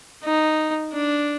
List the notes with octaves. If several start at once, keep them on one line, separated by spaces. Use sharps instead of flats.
D#4
D4